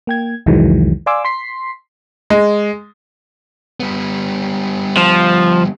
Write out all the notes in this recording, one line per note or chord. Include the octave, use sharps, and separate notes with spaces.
A#3 G5 G#6
C2 F2 D#3 E3 F#3 G#3
D5 F5 G#5 C6 D6 E6
C6 B6 C7
G#3
G3 B3
F3